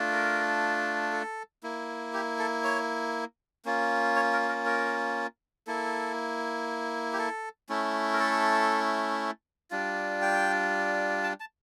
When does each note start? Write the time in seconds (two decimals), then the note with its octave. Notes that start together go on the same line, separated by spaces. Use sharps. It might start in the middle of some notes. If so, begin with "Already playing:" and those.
Already playing: A3 D4 F4
0.12 A#4
1.12 A4
1.63 A#3 E4
2.14 G4
2.39 A4
2.64 C#5
3.65 A#3 C#4 F4
4.16 C#5
4.33 A#4
4.49 A#4
4.66 A#4
5.67 A#3 E4 A4
7.13 G4
7.19 A4
7.69 A3 C#4 E4
8.13 A#4
8.19 A4
9.71 G3 D4 F4
10.22 G5
11.23 A5
11.40 A5